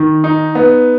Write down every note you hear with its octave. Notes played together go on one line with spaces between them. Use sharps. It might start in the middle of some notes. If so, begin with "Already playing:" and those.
Already playing: D#3
D#4
B3